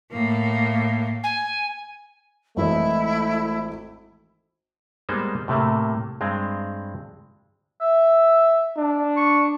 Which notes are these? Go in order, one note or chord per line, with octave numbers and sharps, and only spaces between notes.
A2 A#3
G#5
G#1 E3 A3 E4 D#5
G3 G#3 A#3 B3 D#4 C5
A2 C3 A3 A#3
G2 G#3 C4
E5
D4
C#6